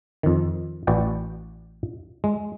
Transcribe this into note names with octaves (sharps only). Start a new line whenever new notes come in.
F2 D#3
A1 F#4 B4 D5 F#5 G5
G#3